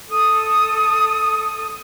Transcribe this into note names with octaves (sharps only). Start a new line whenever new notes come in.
A4 D#6